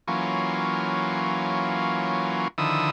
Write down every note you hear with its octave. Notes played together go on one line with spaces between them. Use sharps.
E3 F#3 A#3 C#4 F4
D3 D#3 F3 E4 D#6 E6